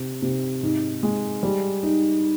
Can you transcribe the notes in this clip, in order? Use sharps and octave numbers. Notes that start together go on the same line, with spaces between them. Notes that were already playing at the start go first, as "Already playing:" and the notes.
Already playing: C3
C3
G#2
G#3
G3
D#4